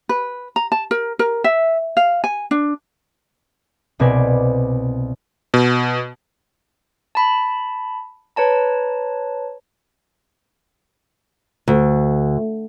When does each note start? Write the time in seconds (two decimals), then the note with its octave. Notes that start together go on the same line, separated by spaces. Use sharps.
0.09 B4
0.56 A#5
0.72 A5
0.91 A#4
1.19 A#4
1.44 E5
1.97 F5
2.24 G#5
2.51 D4
3.99 C2 B2 C4 B4 D5 G#5
5.54 B2
7.15 A5 B5
8.36 B4 C#5 A5 A#5
11.68 D2